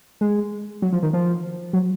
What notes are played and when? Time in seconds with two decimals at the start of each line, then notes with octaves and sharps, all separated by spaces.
0.21 G#3
0.82 F#3
0.93 F3
1.03 D#3
1.13 F3
1.73 F#3